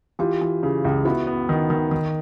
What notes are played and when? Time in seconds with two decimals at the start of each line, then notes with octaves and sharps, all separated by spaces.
0.19 E3 F4 G4
0.41 E3
0.63 C#3
0.85 C#2
1.05 B3 E4 F#4
1.27 B3
1.49 D#3
1.70 D#3
1.91 D#3